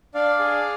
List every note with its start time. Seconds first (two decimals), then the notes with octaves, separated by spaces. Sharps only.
0.14 D4 D5 F5
0.39 G#4